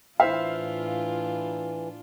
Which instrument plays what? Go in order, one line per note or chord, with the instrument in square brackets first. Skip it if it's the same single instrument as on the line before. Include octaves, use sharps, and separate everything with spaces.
[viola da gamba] A2 D4 F4 [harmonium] E3 [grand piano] E4 C5 E5 [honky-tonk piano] F5